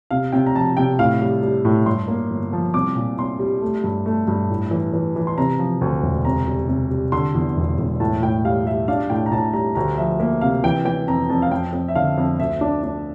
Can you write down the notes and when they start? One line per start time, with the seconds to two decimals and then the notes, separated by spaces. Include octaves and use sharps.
0.11 C3 F5
0.32 C3 G5
0.46 A#5
0.55 F3 A5
0.77 C3 G5
0.99 A2 F5
1.21 G3
1.43 G3
1.65 A2
1.86 G2 C6
2.08 A#3
2.31 G1
2.53 F3
2.74 C2 D6
2.96 A#2
3.18 C2 C6
3.39 G3
3.61 A3
3.84 G2
4.06 A3
4.28 G2
4.50 A2
4.71 E3
4.93 E3
5.16 E3
5.27 C6
5.38 C3 A#5
5.59 F3
5.81 D2
6.03 E1
6.25 C3 A#5
6.48 G3
6.68 C3
6.90 G3
7.12 D3 C6
7.35 E2
7.57 E1
7.78 E1
8.00 A2 A5
8.22 A2 G5
8.45 G3 F5
8.66 G3 E5
8.88 D4 F5
9.10 A2 G5
9.26 A#5
9.31 A2 A5
9.53 G3 A#5
9.75 D2 A#5
9.98 F3 E5
10.20 A#3 E5
10.41 C3 F5
10.64 E3 G5
10.85 E3 G5
11.07 F2 A#5
11.30 F2 A5
11.42 F5
11.51 F2 G5
11.73 F2
11.88 E5
11.95 D3 F5
12.17 F2
12.39 D2 E5
12.61 D4
12.83 D4